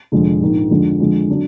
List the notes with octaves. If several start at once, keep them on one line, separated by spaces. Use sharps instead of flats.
F1 F2 D3 G#3
A#1 G#2 D#3
F2 D3 G#3
F2 D3 G#3
D3 F#3 D4